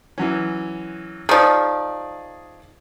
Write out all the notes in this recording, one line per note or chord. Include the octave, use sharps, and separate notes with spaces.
E3 F#3 C#4
D#3 F3 G#4 D5